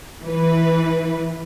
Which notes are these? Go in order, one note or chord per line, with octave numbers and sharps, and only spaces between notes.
E3 B4